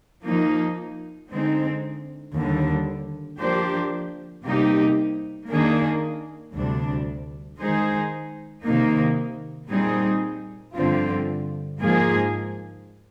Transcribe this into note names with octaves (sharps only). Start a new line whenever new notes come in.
F3 A#3 D#4
D3 G#3 C4 D#4
D#2 D3 G3
F3 A#3 D4 G4 C5
C3 G3 A#3 D#4 G4
D#3 A#3 D4 G#4
D2 C3 G3 D4
D#3 G#3 D#4 G#4 C5
C3 D#3 A#3 D#4
A#2 G3 C4 D#4 G#4
G2 D3 F3 C4 F4
G#2 F3 A#3 F4 G#4